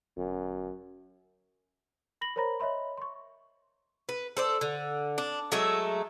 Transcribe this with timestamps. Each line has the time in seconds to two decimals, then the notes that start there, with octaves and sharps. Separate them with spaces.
0.17 G1 F#2
2.21 B5 A#6 F#7
2.36 A#4 C5 C#5 A#5 B5 A#6
2.60 C#5 D#5 E5 B5 C6
2.98 C6 C#6
4.09 B4
4.37 A4 C5 D5
4.61 D3
5.18 D4
5.52 F#3 G#3 A3 E5